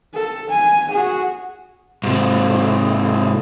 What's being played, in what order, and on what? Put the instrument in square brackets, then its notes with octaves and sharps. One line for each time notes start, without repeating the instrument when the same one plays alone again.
[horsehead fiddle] A4
G#5
F#4 G#4
[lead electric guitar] G#2 C3